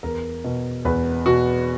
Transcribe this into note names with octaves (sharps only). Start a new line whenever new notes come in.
E2 A#4
B2
E2 B4
B2 F#4